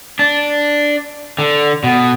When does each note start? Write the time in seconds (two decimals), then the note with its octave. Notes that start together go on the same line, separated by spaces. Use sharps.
0.19 D4
1.38 D3
1.84 B2